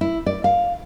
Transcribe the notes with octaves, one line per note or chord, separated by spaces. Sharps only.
E4
D5
F5